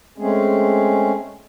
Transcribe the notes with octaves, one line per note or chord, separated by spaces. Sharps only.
G#3 A3 C4 C#4 G#4